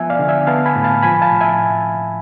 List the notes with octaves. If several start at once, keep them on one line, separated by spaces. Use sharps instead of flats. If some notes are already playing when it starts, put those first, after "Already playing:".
Already playing: F3 B3 E5 G#5
D5 F5
D3
E5 G#5
B3 F5 A5
G#5 B5
A2
F5 A5
F3 G#5 B5
F5 A5
A2
E5 G#5